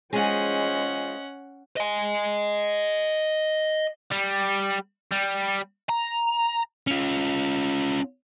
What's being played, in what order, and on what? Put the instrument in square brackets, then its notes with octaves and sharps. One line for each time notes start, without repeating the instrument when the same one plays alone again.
[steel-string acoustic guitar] G#3 F4 G#4 [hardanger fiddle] C#4 F#5 [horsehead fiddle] C5 D#5
[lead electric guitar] D#5 G#5
[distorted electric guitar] G3
G3
A#5
[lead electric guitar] C#4 F4